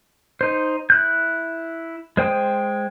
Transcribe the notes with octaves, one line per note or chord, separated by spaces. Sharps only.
D#4 C5
E4 F#6 G6
G#3 C5 G5 D#6